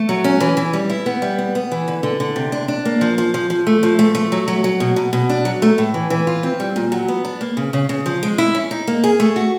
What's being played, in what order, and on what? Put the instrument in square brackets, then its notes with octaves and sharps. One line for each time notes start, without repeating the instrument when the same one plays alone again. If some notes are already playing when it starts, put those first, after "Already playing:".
Already playing: [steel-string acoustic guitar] A3
F#3
C#4
E3
E3
G3
E4
B3
G3
B3
B3
E3
D3
D3
D3
C3
D4
D4
A#3
F3
F3
F3
F3
A3
F3
A3
A3
F#3
F#3
F#3
B2
B2
B2
D4
F#3
A3
A2
E3
E3
F4
C4
G3
A#2
F#3
B3
D4
A#3
C#3
C#3
C#3
F3
G#3
E4
C#4
D#4
A#3
G#4
A3
F#4